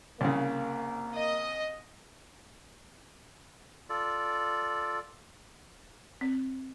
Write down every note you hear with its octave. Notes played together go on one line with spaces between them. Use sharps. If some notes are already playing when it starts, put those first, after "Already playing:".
C2 C#3 A#3
D#5
F4 A4 D5
C4